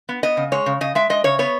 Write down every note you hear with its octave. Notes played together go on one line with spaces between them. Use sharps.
B3
B3 D#5
C#3
G#3 C#5
C#3
C#3 D#5
G#3 E5
G#3 D#5
C#3 C#5
B3 C#5